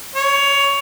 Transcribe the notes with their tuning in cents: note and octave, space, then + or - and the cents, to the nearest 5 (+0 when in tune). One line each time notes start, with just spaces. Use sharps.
C#5 +15